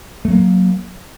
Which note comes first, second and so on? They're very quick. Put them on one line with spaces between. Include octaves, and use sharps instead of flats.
A3 F#3 A#3